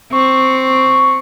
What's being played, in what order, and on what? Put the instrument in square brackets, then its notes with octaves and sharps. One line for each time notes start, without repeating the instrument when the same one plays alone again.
[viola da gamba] C4 [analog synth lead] C#6